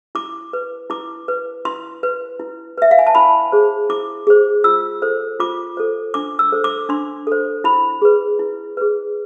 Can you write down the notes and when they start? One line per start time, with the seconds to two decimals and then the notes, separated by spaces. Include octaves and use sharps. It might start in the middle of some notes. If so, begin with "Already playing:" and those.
0.15 E4 D6
0.53 B4
0.90 E4 D6
1.28 B4
1.65 E4 C6
2.03 B4
2.40 E4
2.78 B4 E5
2.91 F5
2.99 G#5
3.07 A5
3.15 E4 B5
3.52 G#4 C5
3.90 E4 D6
4.27 G#4 C5
4.64 F4 E6
5.02 A4 C5
5.40 F4 D6
5.77 A4 C5
6.14 D4 D6
6.39 E6
6.52 A4 C5
6.64 D6
6.89 D4 C6
7.27 A4 C5
7.64 E4 B5
8.02 G#4 B4
8.39 E4
8.77 G#4 B4